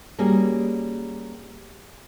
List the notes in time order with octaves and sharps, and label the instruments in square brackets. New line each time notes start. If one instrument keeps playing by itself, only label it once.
[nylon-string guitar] G3 A#3 C#4 F#4 G#4